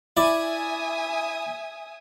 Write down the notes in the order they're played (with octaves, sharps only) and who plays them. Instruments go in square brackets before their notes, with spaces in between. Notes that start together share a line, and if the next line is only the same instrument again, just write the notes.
[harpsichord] E4 D5 [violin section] E5 G#5 D#6